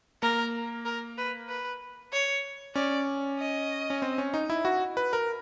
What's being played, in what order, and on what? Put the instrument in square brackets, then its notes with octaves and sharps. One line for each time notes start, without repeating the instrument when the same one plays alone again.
[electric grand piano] A#3 [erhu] A#4
[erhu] A#4
B4
B4
C#5
[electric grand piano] C#4 [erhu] D5
[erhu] D#5
[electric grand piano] C#4
C4
C#4
D#4
E4
F#4
B4
A#4